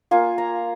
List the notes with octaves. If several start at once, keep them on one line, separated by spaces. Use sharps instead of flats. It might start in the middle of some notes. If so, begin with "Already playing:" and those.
A#3 F4 G#5
A#5